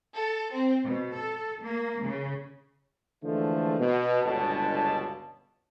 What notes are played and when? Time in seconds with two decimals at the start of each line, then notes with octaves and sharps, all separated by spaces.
0.13 A4
0.52 C4
0.83 B2
1.15 A4
1.62 A#3
2.02 C#3
3.23 D3 E3 F3 G#3 A3
3.79 B2
4.23 G1 C#2 B2 A5